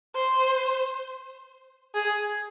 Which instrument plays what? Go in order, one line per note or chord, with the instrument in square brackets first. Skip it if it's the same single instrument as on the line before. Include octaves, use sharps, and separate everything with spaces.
[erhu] C5
G#4